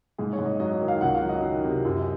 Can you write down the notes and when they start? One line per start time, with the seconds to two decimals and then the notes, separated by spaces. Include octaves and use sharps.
0.18 G#2 G#4
0.33 C#5
0.39 G#2
0.46 D#5
0.60 F#3 D#5
0.73 D#5
0.81 D#3
0.88 F5
1.01 C#2 F#5
1.15 F5
1.22 F#3
1.29 D#5
1.42 D#3
1.64 C3
1.85 F#2